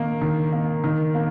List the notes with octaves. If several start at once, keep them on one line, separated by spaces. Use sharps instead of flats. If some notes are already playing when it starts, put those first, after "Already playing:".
Already playing: D#3 A#3
D#3
A#3
D#3
A#3